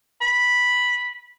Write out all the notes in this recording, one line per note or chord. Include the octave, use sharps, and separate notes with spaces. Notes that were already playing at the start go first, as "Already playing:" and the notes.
B5